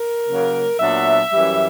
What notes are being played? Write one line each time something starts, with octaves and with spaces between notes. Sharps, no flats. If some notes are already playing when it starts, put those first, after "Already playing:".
Already playing: A#4
C#3 F#3 A#3
A#2 F#3 B3 D4 E5
F#2 E3 G3